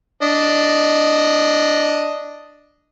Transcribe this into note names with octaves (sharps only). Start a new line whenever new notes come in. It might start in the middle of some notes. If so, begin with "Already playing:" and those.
D4 D#5